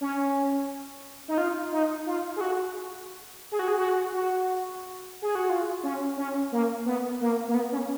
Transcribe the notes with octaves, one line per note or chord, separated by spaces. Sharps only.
C#4
D#4
F4
D#4
F4
G#4
F#4
G#4
F#4
G#4
F#4
F#4
G#4
F#4
F4
C#4
C#4
A#3
B3
A#3
A#3
B3
C#4